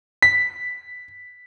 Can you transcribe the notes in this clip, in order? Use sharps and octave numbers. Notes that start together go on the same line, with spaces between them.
B6